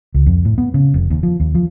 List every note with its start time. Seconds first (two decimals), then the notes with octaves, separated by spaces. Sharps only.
0.14 C#2
0.26 F2
0.45 A2
0.58 B3
0.74 C#3
0.94 F1
1.10 D#2
1.23 F3
1.40 D#2
1.55 F3